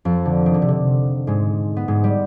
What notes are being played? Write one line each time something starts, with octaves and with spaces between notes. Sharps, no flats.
F2 F3
D3
D#3
D3
C3
D3
G#2 G#3
B3
G#2 G#3
G3